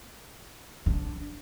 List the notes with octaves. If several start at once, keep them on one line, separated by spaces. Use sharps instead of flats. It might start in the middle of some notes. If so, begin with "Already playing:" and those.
D4